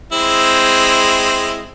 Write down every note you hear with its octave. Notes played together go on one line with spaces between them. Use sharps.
G#3 C4 E4